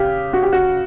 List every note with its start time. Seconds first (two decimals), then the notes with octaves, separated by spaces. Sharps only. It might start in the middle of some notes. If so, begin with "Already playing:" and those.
Already playing: C#3 G4
0.33 F#4
0.42 G4
0.52 F#4